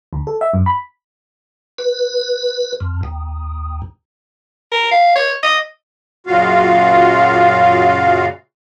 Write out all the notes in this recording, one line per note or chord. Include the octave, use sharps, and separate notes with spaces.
D2
A4
E5
F#2
B5
B4
F2
D#2
A#4
F5
C#5
D#5
F#2 A#2 C#3 F4 F#4 F5